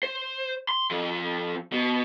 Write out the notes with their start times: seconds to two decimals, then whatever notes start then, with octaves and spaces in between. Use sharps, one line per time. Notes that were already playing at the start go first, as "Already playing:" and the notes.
0.03 C5
0.69 C6
0.91 F2 F3
1.72 B2